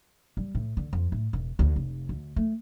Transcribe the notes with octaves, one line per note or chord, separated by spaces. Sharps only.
G3
A2
D3
F2
A2
E1
D2
F1
D2
A3